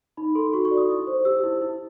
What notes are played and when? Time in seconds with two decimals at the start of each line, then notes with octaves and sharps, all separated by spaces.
0.17 D#4 B5
0.35 A4 C6
0.53 F#4 C#6
0.65 C#6
0.71 D5
0.77 D#6
0.89 E4
1.07 C5
1.25 G4 E6
1.43 E4
1.62 E4